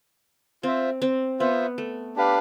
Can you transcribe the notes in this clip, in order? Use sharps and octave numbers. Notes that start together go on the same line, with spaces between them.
C4 F4 C5 E5
C4
B3 F4 C5 E5
A3
D4 G4 B4 F5